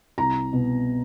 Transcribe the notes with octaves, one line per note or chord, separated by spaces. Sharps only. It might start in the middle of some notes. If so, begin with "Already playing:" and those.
C2 A#5
B2